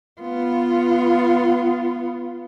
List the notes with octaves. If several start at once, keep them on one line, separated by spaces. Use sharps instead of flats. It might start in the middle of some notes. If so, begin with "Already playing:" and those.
B3 F4